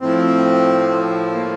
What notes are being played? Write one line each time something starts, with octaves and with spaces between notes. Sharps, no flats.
A2 F3 C4
A#3